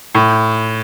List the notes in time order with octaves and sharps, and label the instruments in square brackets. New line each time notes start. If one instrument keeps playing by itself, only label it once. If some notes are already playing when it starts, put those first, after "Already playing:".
[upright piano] A2